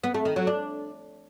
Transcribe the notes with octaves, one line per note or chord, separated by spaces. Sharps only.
B3
A3
D#3
F#3
D4